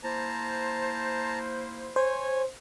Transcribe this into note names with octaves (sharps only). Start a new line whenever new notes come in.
A#3 E4 C5 A5 A#5
C5 C#5 G#5